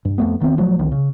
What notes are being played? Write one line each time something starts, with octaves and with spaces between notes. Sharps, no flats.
G2
F2 A3 B3
E1 D#3 B3 C4
D1 F3 F#3 A3
C2 D#3
C#3